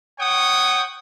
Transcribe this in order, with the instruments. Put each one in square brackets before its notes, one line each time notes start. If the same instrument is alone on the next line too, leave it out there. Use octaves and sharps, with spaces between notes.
[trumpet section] C#5 F#5 G5 C#6 D#6